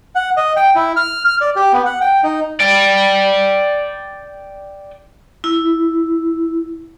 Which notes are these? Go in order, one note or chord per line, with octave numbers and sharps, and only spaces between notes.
F#5
D#5
G5
E4
F6
F6
D5
G4
B3
F#5
G5
D#4
D5 G5
E4